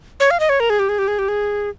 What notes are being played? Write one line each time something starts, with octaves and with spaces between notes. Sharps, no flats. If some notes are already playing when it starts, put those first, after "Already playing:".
C#5
F5
D#5
C#5
A#4
G#4
G4
G#4
G4
G#4
G4
G#4